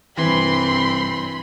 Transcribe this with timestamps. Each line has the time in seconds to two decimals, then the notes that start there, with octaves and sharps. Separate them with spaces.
0.17 C2 G2 E3 C4 B5 C6